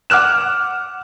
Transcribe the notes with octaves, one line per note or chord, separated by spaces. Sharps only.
F#5 D6 F6 F#6 E7